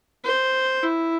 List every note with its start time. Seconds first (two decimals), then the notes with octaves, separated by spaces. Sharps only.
0.24 C5
0.83 E4